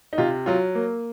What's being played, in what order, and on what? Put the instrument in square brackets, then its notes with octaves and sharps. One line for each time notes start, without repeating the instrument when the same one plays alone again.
[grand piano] D#4
C3 F4
F#3 F4
A#3